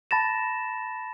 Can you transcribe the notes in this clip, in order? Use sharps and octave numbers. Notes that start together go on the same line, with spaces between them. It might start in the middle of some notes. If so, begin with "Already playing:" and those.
A5 B5 A6 A#6 E7